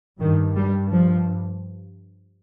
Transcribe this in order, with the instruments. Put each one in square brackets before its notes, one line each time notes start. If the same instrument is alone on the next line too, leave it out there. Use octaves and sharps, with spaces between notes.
[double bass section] G2 D#3
G3
F3